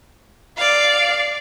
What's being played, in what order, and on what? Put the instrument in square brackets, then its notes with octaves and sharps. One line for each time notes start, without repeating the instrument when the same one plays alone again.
[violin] D5 F5